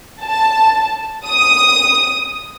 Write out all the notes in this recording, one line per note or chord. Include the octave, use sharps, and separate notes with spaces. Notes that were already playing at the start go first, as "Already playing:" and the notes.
A5
D#6